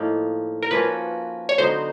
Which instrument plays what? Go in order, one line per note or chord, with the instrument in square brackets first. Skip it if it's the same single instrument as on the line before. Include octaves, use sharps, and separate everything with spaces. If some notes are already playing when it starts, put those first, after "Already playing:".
Already playing: [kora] A2 F3 A#3 D#4
[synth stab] A#4
[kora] F3 A#3 C#4 F#4 [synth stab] B4
[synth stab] C#5
[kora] D3 F#3 B3 D#4 [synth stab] C5